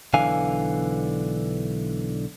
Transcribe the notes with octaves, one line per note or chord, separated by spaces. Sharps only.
B1 D3 E3 F5 G#5